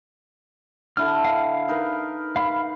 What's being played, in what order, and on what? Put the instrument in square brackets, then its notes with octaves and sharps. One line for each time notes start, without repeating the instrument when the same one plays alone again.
[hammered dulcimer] D3 E4 A4 [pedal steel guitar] F6
[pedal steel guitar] F5
[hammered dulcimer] D#4 A#4 B4
[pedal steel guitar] F5 B5